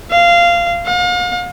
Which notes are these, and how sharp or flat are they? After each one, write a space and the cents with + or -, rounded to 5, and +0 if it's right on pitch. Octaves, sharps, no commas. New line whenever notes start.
F5 -15
F5 +40